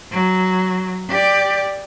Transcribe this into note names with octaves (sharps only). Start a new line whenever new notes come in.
F#3
G4 D5